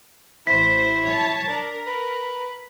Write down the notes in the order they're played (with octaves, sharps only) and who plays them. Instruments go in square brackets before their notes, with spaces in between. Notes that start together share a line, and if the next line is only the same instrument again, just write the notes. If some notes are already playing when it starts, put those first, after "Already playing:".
[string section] A1 C5 [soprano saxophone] E4 [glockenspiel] B6
[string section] C#5 A5
[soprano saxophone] D4 [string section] A#4
[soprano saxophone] B4